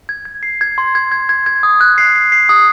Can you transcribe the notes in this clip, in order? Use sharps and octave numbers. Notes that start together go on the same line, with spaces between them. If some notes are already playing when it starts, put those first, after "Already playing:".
G#6
G#6
C7
G#6
C6
G#6
G#6
G#6
G#6
D#6
F#6
C7
C7
C7
D#6